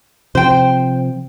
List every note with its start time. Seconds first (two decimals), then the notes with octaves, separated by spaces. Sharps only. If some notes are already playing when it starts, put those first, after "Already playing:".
0.35 C3 F3 C5 G5